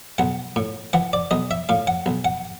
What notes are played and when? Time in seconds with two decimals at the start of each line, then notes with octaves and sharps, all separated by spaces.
0.18 B1 F#5
0.56 A2
0.93 E3 F#5
1.13 D5
1.31 B1 D#5
1.51 E5
1.69 A2 F5
1.87 F#5
2.06 B1
2.25 F#5